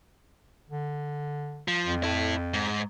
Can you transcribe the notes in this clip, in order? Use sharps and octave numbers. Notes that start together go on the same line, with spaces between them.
D3
F3
F2
E4 A4
G#2